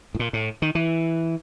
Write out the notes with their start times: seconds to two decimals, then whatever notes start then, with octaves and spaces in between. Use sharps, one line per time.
0.15 A2
0.19 A#2
0.33 A2
0.62 D#3
0.75 E3